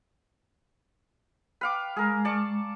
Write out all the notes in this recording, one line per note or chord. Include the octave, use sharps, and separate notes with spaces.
B4 F5 G5 D6
G#3 G#4 A#4
D5 A5 C#6